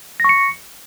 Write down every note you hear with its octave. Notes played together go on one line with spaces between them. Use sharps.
C#6 A#6 C#7